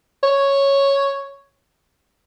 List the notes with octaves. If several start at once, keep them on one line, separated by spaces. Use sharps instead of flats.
C#5